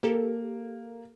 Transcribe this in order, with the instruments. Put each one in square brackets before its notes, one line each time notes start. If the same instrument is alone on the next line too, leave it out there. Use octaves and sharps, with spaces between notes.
[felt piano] A#3 [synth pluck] G4 A4 A#4